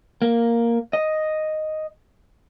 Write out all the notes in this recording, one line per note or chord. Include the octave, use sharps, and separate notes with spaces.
A#3
D#5